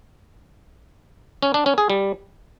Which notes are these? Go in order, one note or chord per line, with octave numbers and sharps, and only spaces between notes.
C#4
D4
C#4
G#4
G3